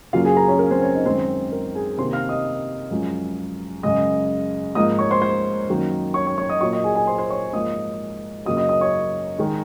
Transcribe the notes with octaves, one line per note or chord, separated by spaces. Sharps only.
F#2 C#3 F#3 A#3 F4 F5
G#4 G#5
A#4 A#5
C#4 C#5
A#4
C4 C5
C#4 C#5
D#4 D#5
F#2 D#3 G#3 C4 C5
A#4
G#4 G#5
C3 D#3 A#3 C5 C6
F5 F6
D#5 D#6
F#2 F3 G#3
F#2 C#3 G#3 D#5 D#6
G#2 F3 A#3 D#5 D#6
C#5 C#6
C5 C6
C5 C6
F#2 D#3 F#3 A#3
C#5 C#6
C#5 C#6
C#5 C#6
D#5 D#6
A#2 F#3 A#3 C#5 C#6
D#5 D#6
G#4 G#5
G#4 G#5
C5 C6
C5 C6
C#5 C#6
G#2 F3 A#3 D#5 D#6
F#2 C#3 F#3 A#3 D#5 D#6
D#5 D#6
D#5 D#6
C#5 C#6
D#3 G#3